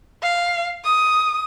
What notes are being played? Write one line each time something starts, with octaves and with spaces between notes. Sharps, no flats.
F5
D#6